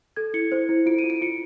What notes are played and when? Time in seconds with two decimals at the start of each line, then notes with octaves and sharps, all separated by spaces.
0.16 A4 G#6
0.34 E4 C#7
0.52 C5
0.69 E4
0.86 F4 D7
0.98 D#7
1.04 F4
1.10 D7
1.21 F4 C#7